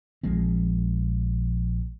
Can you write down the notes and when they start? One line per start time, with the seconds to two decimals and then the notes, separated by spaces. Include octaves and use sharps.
0.23 A#1 F3 G#3 C4